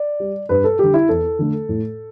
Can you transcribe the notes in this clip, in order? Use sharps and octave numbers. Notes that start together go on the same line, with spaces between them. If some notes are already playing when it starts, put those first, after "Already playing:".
Already playing: D5
G3
G2 B4
A4
D3 G3 G4
E4
E2 A4
D3 A3
A2